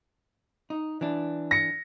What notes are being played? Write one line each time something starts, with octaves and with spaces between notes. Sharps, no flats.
D#4
E3 D4
A#6 C#7